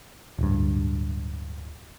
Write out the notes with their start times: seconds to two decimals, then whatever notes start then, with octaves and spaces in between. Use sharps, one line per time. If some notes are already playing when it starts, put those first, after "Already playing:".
0.39 D1 G2